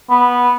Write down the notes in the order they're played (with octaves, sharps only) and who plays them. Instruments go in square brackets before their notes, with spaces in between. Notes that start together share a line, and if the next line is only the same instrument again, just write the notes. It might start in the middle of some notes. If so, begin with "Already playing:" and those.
[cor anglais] B3